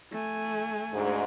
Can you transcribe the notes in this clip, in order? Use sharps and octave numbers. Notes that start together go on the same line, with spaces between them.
A3 G#5
D2 G#2